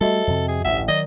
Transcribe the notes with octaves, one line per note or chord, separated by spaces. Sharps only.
G3 A3 F#4 A4 D#5 E5
F2 C3
G#4
A1 D2 G2 E5 F#5
D#3 F#3 D5 D#5